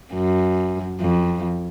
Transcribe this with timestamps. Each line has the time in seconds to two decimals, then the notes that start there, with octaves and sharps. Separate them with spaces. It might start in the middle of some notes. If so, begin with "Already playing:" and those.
0.14 F#2
1.00 F2